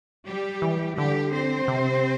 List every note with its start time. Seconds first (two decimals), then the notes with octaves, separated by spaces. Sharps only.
0.26 G3 G4
0.62 E3
0.97 D3 G3 G4
1.32 C4 C5
1.68 C3